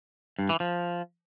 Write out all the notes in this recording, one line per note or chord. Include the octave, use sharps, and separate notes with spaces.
G2
E3
F3